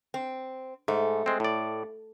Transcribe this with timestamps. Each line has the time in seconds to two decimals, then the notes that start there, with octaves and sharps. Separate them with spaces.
0.14 C4
0.88 G#2 A3
1.26 G#3 C4
1.40 A2 D5